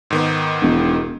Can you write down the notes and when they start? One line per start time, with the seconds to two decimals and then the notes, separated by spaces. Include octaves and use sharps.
0.10 G#2 D#3 B3
0.62 E1